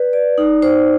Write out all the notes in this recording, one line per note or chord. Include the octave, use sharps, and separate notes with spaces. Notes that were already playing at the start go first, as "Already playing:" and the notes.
Already playing: B4 D5
D5
D#4
C5